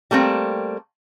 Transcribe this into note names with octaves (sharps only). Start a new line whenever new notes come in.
G3 A3 A#3 C4